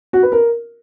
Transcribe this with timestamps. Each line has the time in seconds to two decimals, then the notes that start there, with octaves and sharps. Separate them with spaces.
0.13 F#4
0.23 B4
0.32 A#4